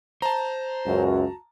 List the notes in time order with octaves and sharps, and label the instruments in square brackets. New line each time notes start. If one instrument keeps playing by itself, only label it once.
[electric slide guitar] C5 [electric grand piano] A5 A#5
[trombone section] C#2 F#2 [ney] F#4